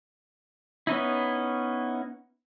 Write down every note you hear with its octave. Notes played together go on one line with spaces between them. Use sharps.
B3 C#4 D#4 E4